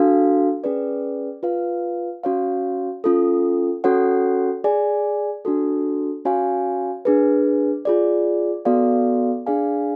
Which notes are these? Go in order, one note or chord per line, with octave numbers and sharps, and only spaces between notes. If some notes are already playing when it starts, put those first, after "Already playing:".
Already playing: D4 F#4 A4 F5
C#4 G#4 B4 D5
F4 B4 F5
C#4 F#4 C#5 F5
C#4 F4 A4
C#4 F#4 A4 C#5 F#5
G#4 D5 G#5
D4 F#4 A4
C#4 F#4 C#5 F5 G#5
D4 G#4 B4
F4 G#4 D5
B3 F#4 A4 D5 F5
D4 G#4 D5 F5 G#5